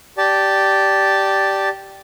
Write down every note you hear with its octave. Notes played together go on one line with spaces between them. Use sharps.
G4 D5 A5